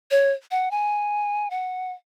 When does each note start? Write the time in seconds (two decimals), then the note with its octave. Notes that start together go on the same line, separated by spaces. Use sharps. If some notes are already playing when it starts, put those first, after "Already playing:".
0.11 C#5
0.51 F#5
0.71 G#5
1.50 F#5